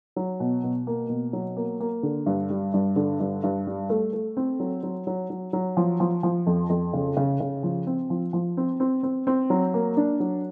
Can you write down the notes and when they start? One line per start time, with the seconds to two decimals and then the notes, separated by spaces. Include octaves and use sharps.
0.16 F#3
0.40 B2
0.63 B2
0.87 A#3
1.09 B2
1.33 F#3
1.57 A#3
1.80 A#3
2.03 D3
2.26 G2
2.50 G3
2.74 G2
2.96 D3
3.20 G2
3.43 G2
3.67 G3
3.90 A3
4.13 A3
4.37 C4
4.60 F#3
4.83 F#3
5.07 F#3
5.30 F#3
5.53 F#3
5.77 F3
6.00 F3
6.23 F3
6.46 F2
6.69 F2
6.93 C#3
7.17 C#3
7.40 C#3
7.63 F3
7.87 C4
8.10 F3
8.33 F3
8.57 C4
8.80 C4
9.03 C4
9.27 C4
9.50 F#3
9.74 A#3
9.97 D4
10.20 F#3